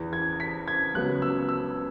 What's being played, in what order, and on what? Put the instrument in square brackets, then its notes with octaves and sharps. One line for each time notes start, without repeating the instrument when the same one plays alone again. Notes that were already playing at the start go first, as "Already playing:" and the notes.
Already playing: [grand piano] E2 E3 B3
G#6
B6
G#6
C#2 C#3 F#3 B3 F#6
E6
E6